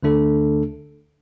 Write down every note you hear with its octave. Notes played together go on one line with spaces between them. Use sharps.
D2 D3 A3 D4 A4